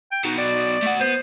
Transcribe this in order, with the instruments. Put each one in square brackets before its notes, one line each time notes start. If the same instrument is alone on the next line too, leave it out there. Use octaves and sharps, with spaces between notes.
[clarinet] G5
[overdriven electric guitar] B2 F#3 [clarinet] D#4
[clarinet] D5
[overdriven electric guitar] A3 F#5
[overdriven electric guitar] B3 [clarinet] C5